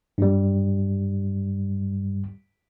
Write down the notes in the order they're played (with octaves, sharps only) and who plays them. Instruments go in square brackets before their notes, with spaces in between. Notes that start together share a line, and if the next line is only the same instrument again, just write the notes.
[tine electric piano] G2 G3